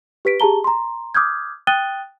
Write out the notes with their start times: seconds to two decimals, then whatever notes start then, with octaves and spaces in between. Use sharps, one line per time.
0.25 G4 B4 B6 D7
0.40 G4 G#4 A5 A#5 G7
0.64 A#5 C6
1.15 D6 D#6 F6 G6 G#6
1.67 G5 D#6 F#6 A6 D#7 G7